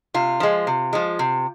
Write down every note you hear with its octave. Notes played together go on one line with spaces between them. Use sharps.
C3 F4
F3 G#3
C3
F3 G#3
C3